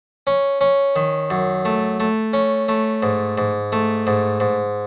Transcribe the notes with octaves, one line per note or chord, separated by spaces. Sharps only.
C#4
C#4
D#3
F#2
A3
A3
C#4
A3
G#2
G#2
A3
G#2
G#2